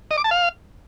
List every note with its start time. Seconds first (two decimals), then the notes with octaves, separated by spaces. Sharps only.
0.11 D#5
0.18 D6
0.24 A5
0.31 F5